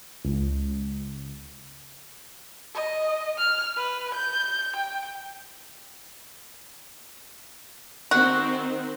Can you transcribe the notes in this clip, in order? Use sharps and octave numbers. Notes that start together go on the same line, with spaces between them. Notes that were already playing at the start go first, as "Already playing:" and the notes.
C#2
D#5
F6
B4
G6
G5
D#3 C4 F#4